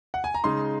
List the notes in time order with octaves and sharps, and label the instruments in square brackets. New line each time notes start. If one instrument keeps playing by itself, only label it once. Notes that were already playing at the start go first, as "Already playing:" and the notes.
[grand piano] F#5
G#5
A#5
C#3 G#3 D#4 C6